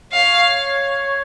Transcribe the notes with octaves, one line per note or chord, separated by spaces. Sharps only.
C#5 F5